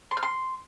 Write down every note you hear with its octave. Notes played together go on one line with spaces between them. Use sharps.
C6
F6
C6